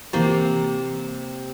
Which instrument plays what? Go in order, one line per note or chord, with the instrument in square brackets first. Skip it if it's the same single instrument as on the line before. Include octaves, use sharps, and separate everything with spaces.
[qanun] C3 A#3 [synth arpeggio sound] E3 G6 A6